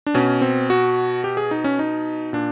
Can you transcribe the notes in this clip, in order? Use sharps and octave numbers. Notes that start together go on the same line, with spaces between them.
D4
B2 C#4
C4
F#4
G4
G#4
D#4
C#4
D#4
A#2 D4